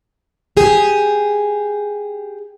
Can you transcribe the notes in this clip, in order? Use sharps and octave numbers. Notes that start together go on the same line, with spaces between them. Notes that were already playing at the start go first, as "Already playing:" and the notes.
G4 G#4